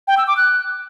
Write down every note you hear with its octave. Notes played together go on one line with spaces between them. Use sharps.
G5
E6
D6
F#6